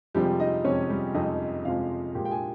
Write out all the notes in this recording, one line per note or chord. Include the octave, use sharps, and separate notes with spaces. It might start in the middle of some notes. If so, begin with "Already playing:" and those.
F2 C3 F3 G3 G#3 G4
D#4 D#5
F2 C3 F3 G#3 C#4 C#5
G3 G4
F2 C3 F3 G#3 D#4 D#5
F2 C3 F3 G#3 F4 F5
A#2 G#3 G4 G5
G5
G#4 G#5